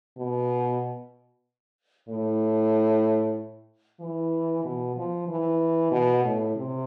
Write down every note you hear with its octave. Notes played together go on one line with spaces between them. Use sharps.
B2
A2
E3
B2
F3
E3
B2
A2
C3